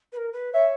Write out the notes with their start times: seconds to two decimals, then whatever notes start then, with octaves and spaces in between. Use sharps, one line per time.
0.13 B4
0.17 A#4
0.33 B4
0.53 C#5 E5